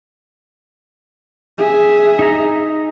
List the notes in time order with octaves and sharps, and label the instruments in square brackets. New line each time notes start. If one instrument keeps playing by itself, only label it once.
[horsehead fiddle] G#4 E5
[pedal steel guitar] D#4 A#5